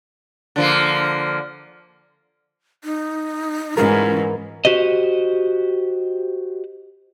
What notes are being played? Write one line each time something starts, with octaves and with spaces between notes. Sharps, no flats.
D3 F3 A#3
D#4
G#2 E3 G#3 C#4 F4 A#4
F#4 G4 C5 D#5